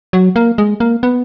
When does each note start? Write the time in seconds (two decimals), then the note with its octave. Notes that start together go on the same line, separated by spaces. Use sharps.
0.13 F#3
0.36 A#3
0.58 G#3
0.80 A#3
1.03 B3